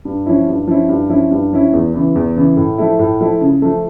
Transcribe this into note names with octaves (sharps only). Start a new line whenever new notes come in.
G2
F3 C#4 E4
G2
F3 C#4 E4
G2
F3 C#4 E4
G2
F3 C#4 E4
E2
C#3 E3
E2
C#3 E3
A2
F3 A3 E4
A2
F3 A3 E4
C#3
F3 A3